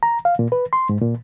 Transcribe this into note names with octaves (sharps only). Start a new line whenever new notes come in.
A#5
F5
A#2
B4
C6
G#2
A#2